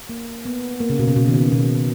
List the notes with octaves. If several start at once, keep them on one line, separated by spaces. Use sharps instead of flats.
A#3
B3
A#3
C#3
B2
C#3
B2
D#3
C#3
B2